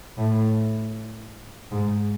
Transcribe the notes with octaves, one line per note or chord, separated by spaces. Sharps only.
A2
G#2